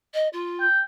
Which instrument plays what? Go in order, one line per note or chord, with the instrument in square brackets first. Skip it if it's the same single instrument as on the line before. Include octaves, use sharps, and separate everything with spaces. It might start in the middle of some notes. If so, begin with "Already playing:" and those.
[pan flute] D#5
F4
[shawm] G5